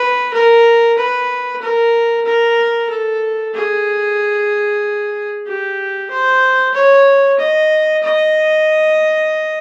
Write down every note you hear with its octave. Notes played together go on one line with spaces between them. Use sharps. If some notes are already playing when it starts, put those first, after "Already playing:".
Already playing: B4
A#4
B4
A#4
A#4
A4
G#4
G4
C5
C#5
D#5
D#5